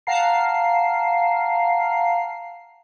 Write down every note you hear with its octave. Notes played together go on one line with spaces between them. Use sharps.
F5 F#5 A5 A#5 C7